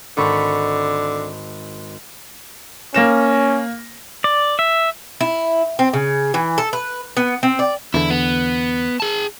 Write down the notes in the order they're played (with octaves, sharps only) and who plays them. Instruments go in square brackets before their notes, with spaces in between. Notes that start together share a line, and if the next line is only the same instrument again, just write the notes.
[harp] G#1 B5 C#6 [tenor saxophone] D3
[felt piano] A#3 A#6 E7 [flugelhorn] C#4
[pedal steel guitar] D5
E5
[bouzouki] E4
C4
C#3
E3
A4
B4
B3
C4
D5
[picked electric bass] E2 D3 [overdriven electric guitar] E4
[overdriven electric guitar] B3
G#4 A5